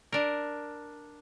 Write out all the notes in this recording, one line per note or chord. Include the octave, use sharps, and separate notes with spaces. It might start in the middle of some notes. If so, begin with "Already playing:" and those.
D4 A#4